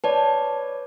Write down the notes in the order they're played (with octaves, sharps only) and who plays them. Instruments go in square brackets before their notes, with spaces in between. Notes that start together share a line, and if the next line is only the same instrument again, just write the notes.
[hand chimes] B4 C#5 D5 [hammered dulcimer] A5